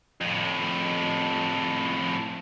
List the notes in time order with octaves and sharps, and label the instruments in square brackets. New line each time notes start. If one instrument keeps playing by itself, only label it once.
[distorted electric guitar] F2 A2